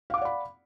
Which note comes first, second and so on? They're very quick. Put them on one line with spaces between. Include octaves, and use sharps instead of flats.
F5 D6 F#5 D5 B5